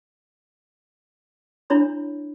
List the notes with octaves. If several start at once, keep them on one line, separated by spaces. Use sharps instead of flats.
D4 E4 C#5 B5